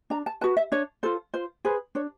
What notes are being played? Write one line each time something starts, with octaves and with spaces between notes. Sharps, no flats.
D4 A#5
A5
F#4 B4 A5
E5
D4 C#5
F4 A4 C5
F4 C5
G#4 B4 C5
D4 C#5